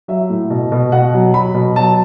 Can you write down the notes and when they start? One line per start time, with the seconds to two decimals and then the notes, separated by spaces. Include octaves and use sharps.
0.08 F#3 E5
0.30 A2
0.50 B2
0.72 B2
0.92 B2 F#5
1.14 F#3
1.33 F#3 B5
1.54 B2
1.76 F#3 A5